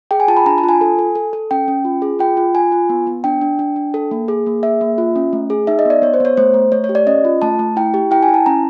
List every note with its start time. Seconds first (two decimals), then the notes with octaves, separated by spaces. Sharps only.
0.11 G#4 G5
0.20 G#5
0.28 F4 A5
0.37 B5
0.46 D4 A#5
0.58 A5
0.63 F4
0.69 G#5
0.81 A4
0.99 A4
1.15 A4
1.33 A4
1.51 C#4 G5
1.68 C#4
1.85 F4
2.02 G#4
2.19 F4 G5
2.37 F4
2.54 F4 G#5
2.72 F4
2.89 B3
3.07 B3
3.24 D4 G5
3.41 D4
3.59 D4
3.76 D4
3.94 A4
4.11 A#3
4.28 G#4
4.46 A#3
4.63 G#4 E5
4.81 A#3
4.98 F4
5.16 C#4
5.33 A3
5.50 G#4
5.67 D#4 E5
5.79 D#5
5.85 B3 D5
6.02 B3 C#5
6.14 C5
6.20 B3 C#5
6.37 A3 C5
6.54 A3
6.72 A3 C#5
6.84 C#5
6.89 G4
6.95 D5
7.07 C#4 D#5
7.25 F4
7.42 A3 A5
7.59 A3
7.76 E4 G5
7.94 G4
8.11 E4 G5
8.23 G#5
8.28 E4
8.34 A5
8.46 C#4 A#5